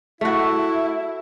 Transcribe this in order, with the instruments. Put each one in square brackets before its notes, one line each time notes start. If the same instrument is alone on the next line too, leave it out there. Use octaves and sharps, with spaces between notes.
[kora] A3 F#4 [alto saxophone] E4 [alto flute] E5